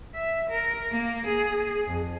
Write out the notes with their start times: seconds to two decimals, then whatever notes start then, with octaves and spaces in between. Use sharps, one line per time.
0.14 E5
0.51 A#4
0.92 A#3
1.28 G#4
1.87 F2